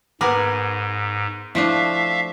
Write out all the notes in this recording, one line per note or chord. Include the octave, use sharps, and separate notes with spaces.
G#2 B3 G#4 A#4 B4 D6
F3 A3 D4 E4 E5 F5